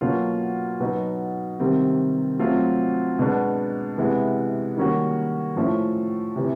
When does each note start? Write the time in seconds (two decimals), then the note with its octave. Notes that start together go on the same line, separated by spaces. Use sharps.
0.01 B2 F#3 A#3 C#4 F4
0.80 B2 F#3 B3 D#4
1.60 C3 D#3 G3 C4
2.39 F#3 A3 C4 F4
3.19 B2 G#3 B3 D4
3.98 C3 E3 G#3 B3
4.77 D#3 G3 A#3 C#4 F#4
5.56 A2 F3 A3 C#4
6.36 C3 E3